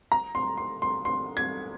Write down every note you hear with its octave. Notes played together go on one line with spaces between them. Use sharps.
A#5
C6
C6
C6
C6
G#6